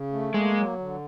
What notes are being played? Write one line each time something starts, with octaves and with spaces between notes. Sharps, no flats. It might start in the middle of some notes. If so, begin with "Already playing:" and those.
Already playing: C#3
A3
G#3 A#3
F#3
D3